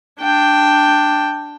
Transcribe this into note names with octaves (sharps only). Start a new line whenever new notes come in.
D4 G5